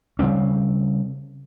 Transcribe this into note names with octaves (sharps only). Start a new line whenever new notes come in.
C#3 G3 C4 C#4